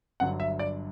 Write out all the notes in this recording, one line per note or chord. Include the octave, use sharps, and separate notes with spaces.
G1 G2 D3 F#3 F#5
E5
D5